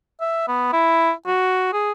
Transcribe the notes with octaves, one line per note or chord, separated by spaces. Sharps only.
E5
B3
E4
F#4
G#4